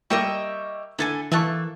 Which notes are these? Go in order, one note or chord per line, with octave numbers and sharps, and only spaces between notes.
G3 A#3 G4 D#5 E5 C#6
D3 E4 A4 G#5
E3 A3 A#3 E5 A5 C#6 F#6